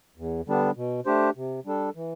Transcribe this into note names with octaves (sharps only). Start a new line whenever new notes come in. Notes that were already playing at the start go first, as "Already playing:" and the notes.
E2
D3 G3 B3 D4
B2
A3 D4 G4 C5
C3
G3 D4 A4
E3